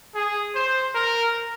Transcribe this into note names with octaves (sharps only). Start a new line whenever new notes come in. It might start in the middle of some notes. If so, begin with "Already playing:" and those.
G#4
C5
A#4